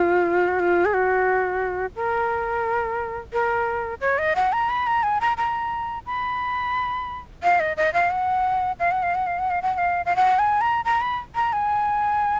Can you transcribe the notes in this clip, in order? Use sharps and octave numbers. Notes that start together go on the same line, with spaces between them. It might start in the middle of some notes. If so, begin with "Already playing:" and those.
Already playing: F4
F#4
F4
G#4
F#4
A#4
A#4
C#5
D#5
F#5
A#5
B5
A#5
G#5
A#5
A#5
B5
F5
D#5
D#5
F5
F#5
F5
F#5
F5
F#5
F5
F#5
F5
F#5
F#5
F5
F5
F#5
G#5
A#5
A#5
B5
A#5
G#5